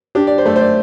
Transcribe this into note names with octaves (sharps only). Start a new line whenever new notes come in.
D4 G4
D5
C5
A3
C5
D5